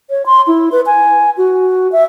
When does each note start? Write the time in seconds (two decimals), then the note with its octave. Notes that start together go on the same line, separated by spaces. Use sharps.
0.10 C#5
0.26 C6
0.47 E4
0.72 B4
0.86 G#5
1.38 F#4
1.92 E5